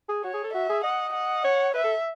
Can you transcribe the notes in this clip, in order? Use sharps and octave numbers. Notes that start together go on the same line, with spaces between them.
G#4
F#4 C#5
G#4
A4
F#4 E5
G#4
D#5 F#5
F#5
C#5
B4 E5
A4